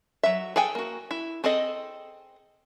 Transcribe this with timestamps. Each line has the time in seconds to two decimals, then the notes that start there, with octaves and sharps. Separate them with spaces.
0.23 F#3 E5
0.56 G#4 A4 G5 G#5
0.75 A#3 F#4
1.11 E4
1.44 C4 G#4 A4 D#5